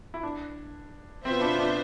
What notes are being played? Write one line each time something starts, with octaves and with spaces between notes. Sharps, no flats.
E4
D4
B2 B3 C4 F4 C5 E5
D4
D4